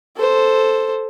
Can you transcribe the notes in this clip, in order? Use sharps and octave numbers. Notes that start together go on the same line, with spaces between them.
A4 C5